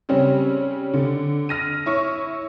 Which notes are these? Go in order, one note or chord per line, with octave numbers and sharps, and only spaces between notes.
C#3 G3 C4 C#4
D3
F6 A#6 D#7
E4 C#5 C#6